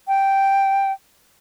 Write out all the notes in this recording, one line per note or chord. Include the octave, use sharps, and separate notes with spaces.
G5